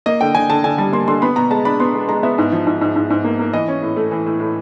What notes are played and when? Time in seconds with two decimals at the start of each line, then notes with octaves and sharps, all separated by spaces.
0.06 A#3 D#5
0.21 D3 G5
0.35 D3 G#5
0.50 D3 A5
0.64 D3 G#5
0.78 G3 A5
0.93 A#3 C6
1.08 D3 C6
1.22 B3 B5
1.36 B2 A#5
1.51 G#3 A5
1.65 D4 B5
1.80 B3 C6
1.94 G#3
2.08 G#3 A#5
2.23 B3 E5
2.38 G#2
2.52 F3
2.67 G#2
2.81 G#2
2.96 G#2
3.10 G#2
3.24 A#3
3.39 A#3
3.53 E3 D#5
3.68 C#4
3.82 A2
3.96 A3
4.11 E3
4.26 A2
4.40 A2